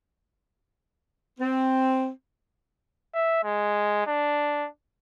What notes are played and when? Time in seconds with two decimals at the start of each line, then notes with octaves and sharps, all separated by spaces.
1.39 C4
3.14 E5
3.44 G#3
4.07 D4